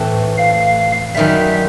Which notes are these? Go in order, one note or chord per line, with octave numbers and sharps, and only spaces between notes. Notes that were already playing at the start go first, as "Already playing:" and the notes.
Already playing: A2 E3 A3 C4
F5
F#2 D#3 G3 E5